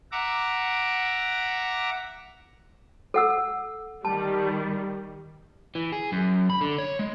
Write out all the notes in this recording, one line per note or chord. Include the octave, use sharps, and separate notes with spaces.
E5 F#5 A#5 D6
A4 F#5 E6
D#3 G3 A5
E3
G#4
F#2
B5
D3
C#5
G#3